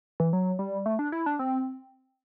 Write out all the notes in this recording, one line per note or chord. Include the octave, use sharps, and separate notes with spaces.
E3
F#3
G3
A3
D4
E4
D4
C4